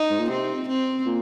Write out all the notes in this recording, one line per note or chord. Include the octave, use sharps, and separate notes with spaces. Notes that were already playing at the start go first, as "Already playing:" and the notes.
Already playing: D#4
G#2
A#2
C3 C4
C4
A#2